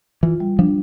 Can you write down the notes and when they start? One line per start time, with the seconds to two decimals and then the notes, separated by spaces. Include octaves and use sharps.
0.23 E3 F4
0.40 G3
0.59 F3 D4